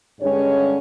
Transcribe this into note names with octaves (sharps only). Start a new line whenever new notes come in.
G2 D3 G#3 C#4 C#5